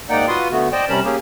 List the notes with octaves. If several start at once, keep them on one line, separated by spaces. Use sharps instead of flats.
G#2 A#3 D#4 D5 F#5 G5
F4 F#4 B4 C6 D#6
D3 A3 B3 F#4
C5 D5 D#5 G5 A5
C3 G3 C#4 A#4 A5 B5
A#3 C#4 G4 G#4